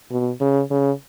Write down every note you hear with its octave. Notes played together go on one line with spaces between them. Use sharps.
B2
C#3
C#3